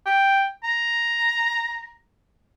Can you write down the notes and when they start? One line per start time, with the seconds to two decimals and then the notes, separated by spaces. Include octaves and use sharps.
0.06 G5
0.64 A#5